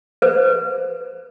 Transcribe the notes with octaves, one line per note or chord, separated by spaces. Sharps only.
B4 C5